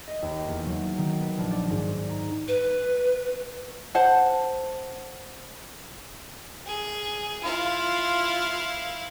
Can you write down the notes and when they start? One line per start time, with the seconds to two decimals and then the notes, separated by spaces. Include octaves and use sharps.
0.08 D#5
0.22 D#2
0.47 E2
0.66 F#3
0.98 D#3
1.21 B4
1.37 A#1
1.51 D5
1.70 G#2
2.09 A#5
2.48 B4
3.95 C5 F#5 A5
6.67 G#4
7.43 E4 F4 F5